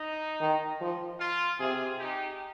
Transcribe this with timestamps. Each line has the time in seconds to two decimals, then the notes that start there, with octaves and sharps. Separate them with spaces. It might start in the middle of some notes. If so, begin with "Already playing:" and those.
Already playing: D#4
0.41 D#3
0.81 F3
1.20 F4
1.59 C3 F4 G#4
1.99 D#4 G4